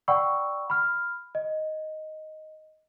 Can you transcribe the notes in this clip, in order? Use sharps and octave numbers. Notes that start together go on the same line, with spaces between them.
D5 F#5 G5 B5 C#6 E6
B5 F6
D#5